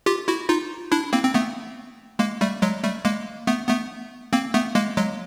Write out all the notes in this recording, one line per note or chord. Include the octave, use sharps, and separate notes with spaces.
F4 G4
E4 F#4
D#4 F4
D4 E4
A#3 C4
C4
A3 B3
G#3 A#3
G3 A3
F#3 G#3
G3 A3
G#3 A#3
A3 B3
A3 B3
A#3 C4
A3 B3
G#3 A#3
F#3 G#3